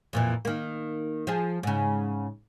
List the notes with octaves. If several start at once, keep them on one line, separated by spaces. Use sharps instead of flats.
F2 A#2 E3
D#3 A#3
F3 G#4
G#2 C#3